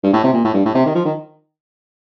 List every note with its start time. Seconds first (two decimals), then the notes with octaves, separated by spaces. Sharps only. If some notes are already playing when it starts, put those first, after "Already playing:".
0.03 G2
0.13 A2
0.24 C3
0.33 A#2
0.44 A2
0.54 G2
0.65 A2
0.75 C3
0.86 D#3
0.95 F3
1.05 D#3